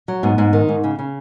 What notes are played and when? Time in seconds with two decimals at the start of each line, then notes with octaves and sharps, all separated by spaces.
0.08 F#3
0.23 G#2 B3
0.38 G#2
0.53 D#3
0.69 G#2
0.84 C#3
0.99 C#3